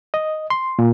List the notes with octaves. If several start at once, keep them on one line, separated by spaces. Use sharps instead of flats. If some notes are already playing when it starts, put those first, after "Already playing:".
D#5
C6
A#2